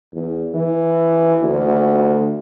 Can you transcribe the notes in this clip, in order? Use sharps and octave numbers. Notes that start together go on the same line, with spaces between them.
E2
E3
D2